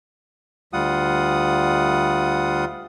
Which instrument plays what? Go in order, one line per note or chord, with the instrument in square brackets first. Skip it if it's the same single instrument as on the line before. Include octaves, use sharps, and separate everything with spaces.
[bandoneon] D2 G3 F4 F#5 D#6